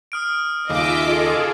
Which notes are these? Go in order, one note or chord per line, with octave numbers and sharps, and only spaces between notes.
D#6 F6 D7
D#2 C#3 A#3 F4 D#5 E5 D6 E6
F4 G#4 A4